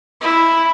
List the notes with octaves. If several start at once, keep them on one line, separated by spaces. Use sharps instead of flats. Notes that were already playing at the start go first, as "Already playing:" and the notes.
E4